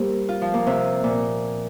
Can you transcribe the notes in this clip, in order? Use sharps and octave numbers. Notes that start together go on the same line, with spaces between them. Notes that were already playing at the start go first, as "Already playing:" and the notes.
Already playing: G3 A#3 C4
F4
F3
A#3
C3
A#2